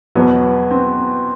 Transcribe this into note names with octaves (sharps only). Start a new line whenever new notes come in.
E2 B2 F#3 B3
C4